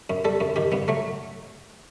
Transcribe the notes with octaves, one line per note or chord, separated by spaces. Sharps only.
F#2
G3 A4
F#2
D#3 G4
G2 B3
F#3 A3